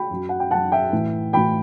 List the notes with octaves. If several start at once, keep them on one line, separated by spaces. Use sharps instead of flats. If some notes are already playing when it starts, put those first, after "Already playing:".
Already playing: G5 B5
F#2 F#3
F#5
G5
F#2 F#3 F#5 A5
E5 G5
A2 E3
A2 E3 G5 B5